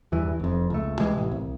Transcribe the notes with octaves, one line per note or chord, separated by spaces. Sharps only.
E2 G2 E3
F1 F2
C#2 A3
C3 E3 G#3
A1
C2